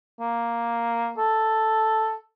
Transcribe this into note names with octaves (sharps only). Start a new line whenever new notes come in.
A#3
A4